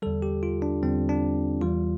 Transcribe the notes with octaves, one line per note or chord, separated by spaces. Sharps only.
E2 D3 G3 A4
G4
F4
D4
E2 D3 G3 C4
D4
E2 E3 G3 F4